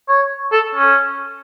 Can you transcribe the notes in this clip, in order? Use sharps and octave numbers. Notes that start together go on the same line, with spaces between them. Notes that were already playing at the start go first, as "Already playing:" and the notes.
C#5
A4
C#4